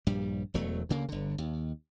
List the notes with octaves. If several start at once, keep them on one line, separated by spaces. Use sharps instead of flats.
A#1 G2 G3
E1 E2 F#3 A3
D2 C#3 A#3
G1 D3
D#2